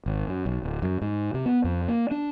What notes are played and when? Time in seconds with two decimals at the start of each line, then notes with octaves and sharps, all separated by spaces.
0.06 G#1
0.28 F#2
0.46 B1
0.63 D1
0.82 F#2
1.01 G#2
1.34 C3
1.46 B3
1.64 F2
1.88 A#3
2.11 D4